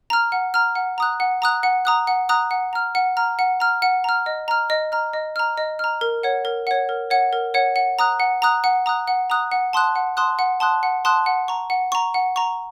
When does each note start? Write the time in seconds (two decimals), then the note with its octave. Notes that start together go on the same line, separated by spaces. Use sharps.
0.10 A#5 F6
0.32 F#5
0.54 A#5 F6
0.75 F#5
0.98 A#5 D#6 F#6
1.20 F#5
1.42 A#5 D#6 F#6
1.63 F#5
1.85 A#5 D#6 F#6
2.07 F#5
2.29 A#5 D#6 F#6
2.51 F#5
2.73 A#5 F6
2.95 F#5
3.17 A#5 F6
3.39 F#5
3.60 A#5 F6
3.82 F#5
4.04 A#5 F6
4.26 D#5
4.48 A#5 F6
4.70 D#5
4.92 A#5 F6
5.13 D#5
5.36 A#5 F6
5.58 D#5
5.79 A#5 F6
6.01 A#4
6.23 C#5 F#5
6.45 A#4
6.67 C#5 F#5
6.89 A#4
7.11 C#5 F#5
7.33 A#4
7.54 C#5 F#5
7.76 F#5
7.99 A#5 D#6 F#6
8.20 F#5
8.42 A#5 D#6 F#6
8.64 F#5
8.86 A#5 D#6 F#6
9.07 F#5
9.30 A#5 D#6 F#6
9.52 F#5
9.73 A5 C6 D#6 F#6
9.96 F#5
10.17 A5 C6 D#6 F#6
10.39 F#5
10.60 A5 C6 D#6 F#6
10.83 F#5
11.05 A5 C6 D#6 F#6
11.26 F#5
11.48 A#5 C#6
11.70 F#5
11.92 A#5 C#6
12.14 F#5
12.36 A#5 C#6